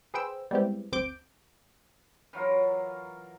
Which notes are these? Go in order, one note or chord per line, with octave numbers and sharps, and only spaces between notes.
G#4 B4 C5 G5 E6
G3 G#3 B3 C4 E4 G4
G1 D2 C4 D6 G6 D7
E3 F#3 F4 A#4